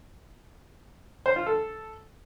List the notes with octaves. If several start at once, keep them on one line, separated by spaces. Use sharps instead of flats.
C5
F4
A4